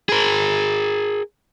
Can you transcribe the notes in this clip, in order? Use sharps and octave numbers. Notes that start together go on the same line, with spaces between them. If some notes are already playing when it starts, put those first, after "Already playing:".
G#4 A#4